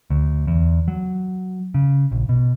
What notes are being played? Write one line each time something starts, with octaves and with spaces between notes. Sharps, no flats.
D2
E2
F#3
C#3
A#1
B2